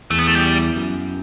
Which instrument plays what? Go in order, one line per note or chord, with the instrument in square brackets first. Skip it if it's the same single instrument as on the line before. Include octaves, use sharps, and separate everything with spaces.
[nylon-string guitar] E2 [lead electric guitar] A3
[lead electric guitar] B3
A3
G3
[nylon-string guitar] F#2